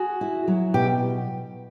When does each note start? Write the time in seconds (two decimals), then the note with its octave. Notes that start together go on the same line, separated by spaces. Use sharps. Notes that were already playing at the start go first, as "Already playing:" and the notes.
Already playing: F#4 G#4
0.21 E4
0.48 F#3
0.74 B2 G4